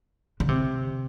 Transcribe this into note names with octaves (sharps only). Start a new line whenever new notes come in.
D3
C3